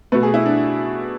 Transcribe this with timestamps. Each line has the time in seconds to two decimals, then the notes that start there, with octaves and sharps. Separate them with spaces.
0.12 B2 A3 B4
0.23 G#4
0.34 E4
0.46 D4